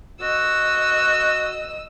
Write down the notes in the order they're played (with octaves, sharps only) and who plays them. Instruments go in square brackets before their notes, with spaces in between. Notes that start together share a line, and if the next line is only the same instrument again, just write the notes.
[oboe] F#4 [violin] D#5 E6